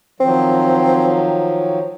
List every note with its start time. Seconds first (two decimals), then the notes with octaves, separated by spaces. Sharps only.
0.20 D#3 F3 F#3 C4